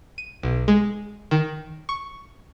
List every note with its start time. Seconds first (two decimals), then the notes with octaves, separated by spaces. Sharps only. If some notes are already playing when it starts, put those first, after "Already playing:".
0.18 D#7
0.43 B1
0.68 G#3
1.31 D#3
1.89 C#6